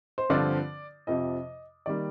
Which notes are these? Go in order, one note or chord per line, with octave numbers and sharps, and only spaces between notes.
C5
G2 D3 F3 C4 F4 D5
F2 C3 F3 D#5
D#3 G3 A#3 D5